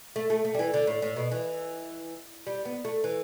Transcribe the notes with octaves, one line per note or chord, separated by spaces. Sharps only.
A3
A3
A3
G3
E3
D3
A2
A2
B2
E3
G3
B3
A3
E3